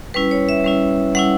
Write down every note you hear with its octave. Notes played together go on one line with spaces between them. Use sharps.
G3 C#4 E4 B4
C#5
E5
G3 C#4 E4
G3 C#4 E4 F#5